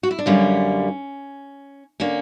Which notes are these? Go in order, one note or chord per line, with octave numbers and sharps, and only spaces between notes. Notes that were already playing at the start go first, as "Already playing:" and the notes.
F#4
E4
D4
F#2 D3 G3 A#3 C#4
D3 A#3 C#4